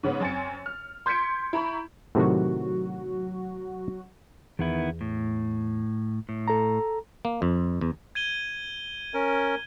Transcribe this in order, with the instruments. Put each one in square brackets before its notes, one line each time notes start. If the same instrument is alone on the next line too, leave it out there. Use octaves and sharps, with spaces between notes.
[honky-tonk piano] G#2 C#3 B3 C#4
F#2 C4 G#5 A6 C#7
F6
C6 G6 G#6 B6 C#7 D7
E4 A#5 B5 C#6
[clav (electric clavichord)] A2 C3 D#3 [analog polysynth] F#3 F#4
[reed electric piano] E2 [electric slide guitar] D#3 B3 E4
[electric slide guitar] A2
A2
[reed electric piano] A4 A#5
[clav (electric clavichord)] A#3
F2
E2
[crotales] G#6 D#7 G7
[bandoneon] C#4 A#4